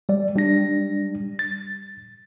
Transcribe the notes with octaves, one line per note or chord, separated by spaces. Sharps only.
G3 D5
G3 D4 A#6
A6